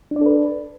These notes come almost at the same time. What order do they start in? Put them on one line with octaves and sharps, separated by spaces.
D4 D5 A4 B4